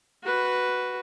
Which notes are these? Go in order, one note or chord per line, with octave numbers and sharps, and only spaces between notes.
F#4 B4